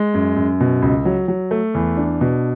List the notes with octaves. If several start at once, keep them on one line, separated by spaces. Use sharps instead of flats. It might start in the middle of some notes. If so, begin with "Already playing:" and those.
Already playing: G#3
F#2
F#2
B2
C#2
F#3
F#3
A3
E2
D4
B2